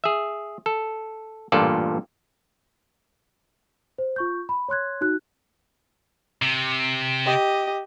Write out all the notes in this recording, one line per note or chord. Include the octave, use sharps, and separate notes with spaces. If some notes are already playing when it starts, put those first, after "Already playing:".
G#4 E5
A4
A1 G2 A#2 F4 A4 D5
C5
F4 C#6 G6
B5
C#5 C6 F#6 G#6
D#4 F#4 F#6
C3
G4 D#5